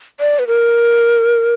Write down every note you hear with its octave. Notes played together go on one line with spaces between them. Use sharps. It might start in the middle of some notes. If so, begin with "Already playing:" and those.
D5
B4
A#4